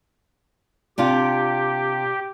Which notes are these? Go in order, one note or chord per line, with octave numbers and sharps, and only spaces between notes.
C3 D4 F4 G4